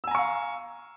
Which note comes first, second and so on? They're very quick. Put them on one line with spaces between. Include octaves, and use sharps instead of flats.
E6 G#5 A#5 C#6 F5